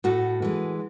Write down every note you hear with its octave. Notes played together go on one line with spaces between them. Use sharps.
A2 F#4 A4
E3 G#3